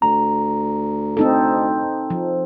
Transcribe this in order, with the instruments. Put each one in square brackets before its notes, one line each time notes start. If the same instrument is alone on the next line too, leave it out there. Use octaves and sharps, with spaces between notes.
[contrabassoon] D2 [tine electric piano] A#5
[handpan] C4 D#4 A4
F3